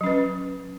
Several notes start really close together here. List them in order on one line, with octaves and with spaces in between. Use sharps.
F#3 C#4 B4